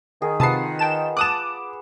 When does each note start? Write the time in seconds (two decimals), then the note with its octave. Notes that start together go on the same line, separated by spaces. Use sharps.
0.22 D#3 G#4
0.40 C3 F4 B4 F#5 A5 D#6 C7
0.79 G5 A5 E7
1.17 A5 D6 D#6 F#6 E7